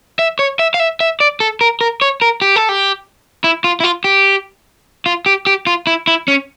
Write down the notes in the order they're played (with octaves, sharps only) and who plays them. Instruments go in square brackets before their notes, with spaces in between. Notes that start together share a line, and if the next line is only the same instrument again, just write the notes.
[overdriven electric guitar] E5
C#5
E5
F5
E5
E5
D5
A4
A#4
A#4
C#5
A#4
G4
A4
G4
E4
F4
E4
F4
G4
F4
G4
G4
F4
E4
E4
C#4